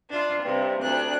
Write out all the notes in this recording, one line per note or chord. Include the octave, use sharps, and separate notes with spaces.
D4 F4
G2 C3
D2 D4 F#6